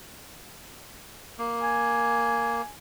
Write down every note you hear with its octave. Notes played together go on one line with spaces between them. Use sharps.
A#3
G#5